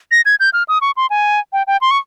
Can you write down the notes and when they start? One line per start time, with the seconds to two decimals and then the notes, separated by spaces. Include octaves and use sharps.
0.11 A#6
0.25 G#6
0.40 G6
0.53 F6
0.68 D#6
0.81 C#6
0.97 C6
1.10 G#5
1.53 G5
1.67 G5
1.81 C6
1.91 C#6